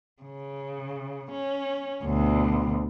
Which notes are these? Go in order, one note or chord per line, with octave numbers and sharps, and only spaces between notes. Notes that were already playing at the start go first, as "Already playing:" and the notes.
C#3
C#4
D2 B2